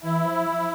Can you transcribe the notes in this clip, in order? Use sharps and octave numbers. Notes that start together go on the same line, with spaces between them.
E3 E4
F3
F3